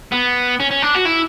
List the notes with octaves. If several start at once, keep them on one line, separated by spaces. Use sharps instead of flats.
B3
C#4
C#4
D4
F#4
E4